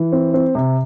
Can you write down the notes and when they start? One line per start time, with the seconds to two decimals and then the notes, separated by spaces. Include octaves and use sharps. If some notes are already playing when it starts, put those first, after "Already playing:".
Already playing: E3
0.12 C4
0.34 C4
0.55 C3